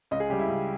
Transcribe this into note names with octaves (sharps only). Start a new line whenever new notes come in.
C#2 D#5
G#4
C#3 G3 G4
E4
C#2